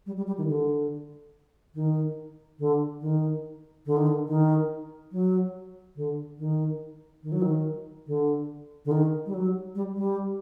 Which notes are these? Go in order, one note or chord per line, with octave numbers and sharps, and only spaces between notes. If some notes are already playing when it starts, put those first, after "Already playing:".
G3
G3
G3
D#3
D3
D#3
D3
D#3
D3
D#3
D3
D#3
F#3
D3
D#3
D#3
F#3
D#3
D3
D3
D#3
G3
F#3
G3
G3